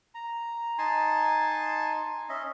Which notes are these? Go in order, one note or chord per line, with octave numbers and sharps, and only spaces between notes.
A#5
D#4 G#5 A5 C6
C#4 D#5 E5